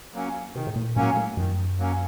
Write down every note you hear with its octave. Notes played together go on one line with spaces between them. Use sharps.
F#3 A#3 C#4
C3 D#3
A2
A#2
A2 F#3 A#3 C#4
A2
F#2 D#3
F#3 A#3 C#4